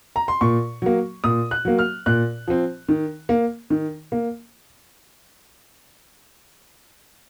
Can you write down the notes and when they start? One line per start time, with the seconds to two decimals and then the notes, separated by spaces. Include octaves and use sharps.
0.16 A#5
0.28 C6
0.41 A#2 C#6
0.82 F#3 A#3
1.24 A#2 D#6
1.51 F#6
1.65 F#3 A#3
1.79 F6
2.06 A#2 F#6
2.48 F3 C4
2.88 D#3
3.29 A#3
3.70 D#3
4.12 A#3